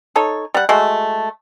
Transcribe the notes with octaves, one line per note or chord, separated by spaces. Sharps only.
D#4 A4 C#5
G3 F#5
G#3 A3 F#4